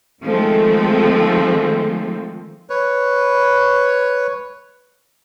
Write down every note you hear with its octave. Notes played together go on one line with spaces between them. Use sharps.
D#3 F3 G#3 A3 C4
B4 C#5